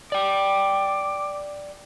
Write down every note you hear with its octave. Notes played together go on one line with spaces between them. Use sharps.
D5 G5 D6